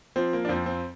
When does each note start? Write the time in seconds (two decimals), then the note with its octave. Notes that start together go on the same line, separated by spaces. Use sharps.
0.16 F3 C4
0.33 A#3
0.45 D4
0.49 F2 C4
0.66 C4